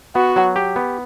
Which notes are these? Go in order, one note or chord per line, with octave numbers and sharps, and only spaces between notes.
B3 F#4
F#3
G4
B3